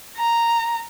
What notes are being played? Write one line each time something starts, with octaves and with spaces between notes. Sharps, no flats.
A#5